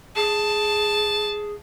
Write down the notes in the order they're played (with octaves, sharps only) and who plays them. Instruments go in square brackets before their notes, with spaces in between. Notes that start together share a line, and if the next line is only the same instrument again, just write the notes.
[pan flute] G#4 [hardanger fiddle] A5